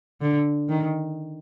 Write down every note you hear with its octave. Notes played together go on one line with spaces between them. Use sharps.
D3
D#3